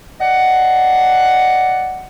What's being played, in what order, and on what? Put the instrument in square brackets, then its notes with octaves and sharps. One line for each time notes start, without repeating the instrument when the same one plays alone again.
[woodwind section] D5 D#5 F#5